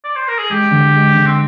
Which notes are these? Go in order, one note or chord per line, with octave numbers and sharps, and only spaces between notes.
D5
C5
A#4
G#4
G#3 G4
D3
G#3
D3
C4